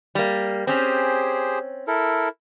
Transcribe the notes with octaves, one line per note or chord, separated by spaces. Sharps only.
G3 A#3
C4 C#4 G4 G#4 C5
E4 A4 A#4